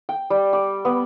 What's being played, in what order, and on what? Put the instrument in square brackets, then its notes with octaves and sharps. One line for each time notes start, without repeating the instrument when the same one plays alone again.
[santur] G5
G3
D6
B3